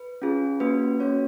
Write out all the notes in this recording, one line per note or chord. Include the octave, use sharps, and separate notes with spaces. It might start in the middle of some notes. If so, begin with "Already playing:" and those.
Already playing: B4
C#4 F4 G#4
A#3 C#4 F#4 B4
A#3 C#4 F#4 C#5